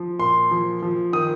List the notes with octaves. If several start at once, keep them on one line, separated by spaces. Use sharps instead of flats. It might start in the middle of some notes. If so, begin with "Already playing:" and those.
Already playing: F3
A#2 C6
F3
F3
D#3 D#6